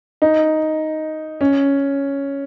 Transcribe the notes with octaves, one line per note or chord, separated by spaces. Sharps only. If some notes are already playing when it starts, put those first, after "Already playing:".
D#4
C#4